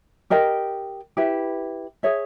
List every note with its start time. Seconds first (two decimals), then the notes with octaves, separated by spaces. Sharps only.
0.30 G4 A#4 D#5 G5
1.17 E4 G4 B4
2.03 G#4 C#5 E5